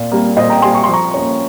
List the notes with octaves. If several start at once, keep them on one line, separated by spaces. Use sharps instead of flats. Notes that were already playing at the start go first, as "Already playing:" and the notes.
Already playing: A#2
G3 A#3
A#2 C5 D#5
G5 A#5
G3 A#3 G#5 C6
C#6
F3 C6
A#5 C#6
A#3 C#4